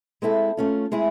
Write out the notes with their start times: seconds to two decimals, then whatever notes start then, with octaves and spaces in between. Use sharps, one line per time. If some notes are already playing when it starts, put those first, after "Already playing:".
0.22 G#3 C4 E4 A4
0.57 A3 C#4 F4
0.92 G#3 C4 E4 G#4